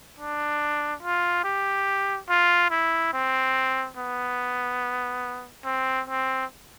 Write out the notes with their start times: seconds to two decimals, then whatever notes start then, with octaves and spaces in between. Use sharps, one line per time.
0.19 D4
1.03 F4
1.44 G4
2.29 F4
2.71 E4
3.13 C4
3.97 B3
5.65 C4
6.08 C4